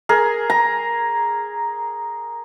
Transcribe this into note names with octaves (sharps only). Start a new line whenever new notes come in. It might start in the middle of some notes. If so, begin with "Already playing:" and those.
G#4 A#4
A#5